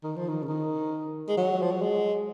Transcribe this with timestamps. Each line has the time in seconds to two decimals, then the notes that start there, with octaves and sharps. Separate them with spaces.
0.04 D#3
0.16 F3
0.28 D#3
0.43 C#3
0.48 D#3
1.28 G#3
1.37 F#3
1.62 F3
1.72 F#3
1.82 G#3